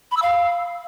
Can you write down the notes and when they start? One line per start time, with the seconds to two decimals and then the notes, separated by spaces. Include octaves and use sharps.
0.11 B5
0.17 E6
0.22 F5